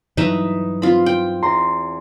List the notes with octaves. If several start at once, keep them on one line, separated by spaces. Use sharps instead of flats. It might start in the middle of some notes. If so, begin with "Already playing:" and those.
G2 E3 F#3 D#4 B4 E5
C4 F4 B5
G5
E2 A#5 C6